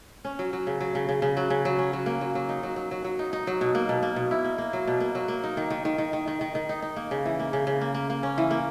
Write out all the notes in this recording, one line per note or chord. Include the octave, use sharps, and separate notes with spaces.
C#4
F#3
F#3
C#3
F#3
C#3
C#3
C#3
F#3
C#3
F#3
C#4
F#3
A#3
F#3
F#3
D#4
F#3
F#3
F#3
F#3
D#4
D#4
F#3
B2
A#3
B2
A#3
B2
E4
A#3
A#3
F#3
B2
A#3
F#3
A#3
D#4
D#3
D#3
D#3
D#3
D#3
D#3
D#3
D#3
D#4
D#4
A#3
C#3
E3
A#3
C#3
C#3
A#3
A#3
A#3
C#4
E3
A#3